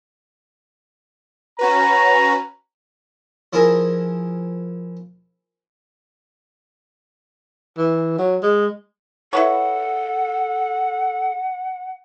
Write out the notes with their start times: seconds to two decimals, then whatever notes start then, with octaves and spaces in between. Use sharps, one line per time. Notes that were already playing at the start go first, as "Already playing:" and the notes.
1.59 C#4 F#4 B4 A#5
3.53 F3 E4 G#4 A#4
7.78 E3
8.18 F#3
8.43 G#3
9.33 E4 A4 B4 C#5 F#5